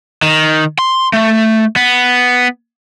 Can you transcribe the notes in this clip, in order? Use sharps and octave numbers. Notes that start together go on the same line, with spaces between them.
D#3
C6
A3
B3